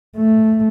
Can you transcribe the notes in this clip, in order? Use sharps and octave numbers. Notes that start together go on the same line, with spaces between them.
A3